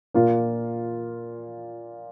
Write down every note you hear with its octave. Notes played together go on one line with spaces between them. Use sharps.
A#2 A#3 F4